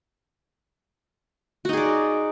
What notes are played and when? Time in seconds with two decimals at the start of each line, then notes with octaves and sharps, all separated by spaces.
1.65 F#4
1.69 D#4
1.73 G#4
1.77 D5